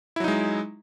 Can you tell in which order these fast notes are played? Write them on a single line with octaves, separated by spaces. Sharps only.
E4 F#3 D#4 G#3